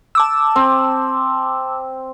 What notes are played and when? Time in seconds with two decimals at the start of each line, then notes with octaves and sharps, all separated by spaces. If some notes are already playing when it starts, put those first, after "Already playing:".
0.15 A5 D6 E6
0.56 C4